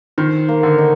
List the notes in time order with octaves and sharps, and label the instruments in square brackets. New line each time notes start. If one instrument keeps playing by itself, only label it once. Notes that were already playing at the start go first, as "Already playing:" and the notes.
[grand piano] D#3 [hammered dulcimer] C5
[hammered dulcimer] A#3
[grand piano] D3
[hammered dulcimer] D#4